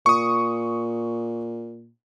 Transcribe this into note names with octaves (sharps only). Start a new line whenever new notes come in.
A#2 C#6 D#6